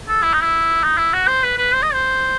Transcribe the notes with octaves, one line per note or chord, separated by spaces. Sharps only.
A4
E4
D#4
E4
D#4
E4
F#4
C5
B4
B4
C5
D#5
C5